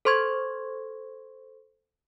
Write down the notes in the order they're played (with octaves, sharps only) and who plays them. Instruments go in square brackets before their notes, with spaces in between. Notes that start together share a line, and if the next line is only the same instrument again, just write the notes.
[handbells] A4 C5 C6 C#6 G#6